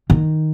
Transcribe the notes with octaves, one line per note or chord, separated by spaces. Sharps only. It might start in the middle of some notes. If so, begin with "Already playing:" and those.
D#3